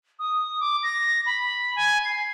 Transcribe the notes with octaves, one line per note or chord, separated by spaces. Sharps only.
D#6
D6
A#6
B5
G#5
C7